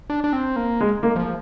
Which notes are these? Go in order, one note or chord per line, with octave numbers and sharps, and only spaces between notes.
D4
D4
C4
A#3
G#3
A#3
F3